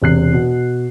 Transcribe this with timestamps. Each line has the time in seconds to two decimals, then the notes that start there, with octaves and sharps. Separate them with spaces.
0.01 E1 C3 F#6 C7
0.33 B2